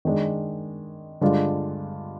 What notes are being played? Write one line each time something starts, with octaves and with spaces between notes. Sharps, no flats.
D#3 G#3 D4
G2 D3 G#3 D4 F4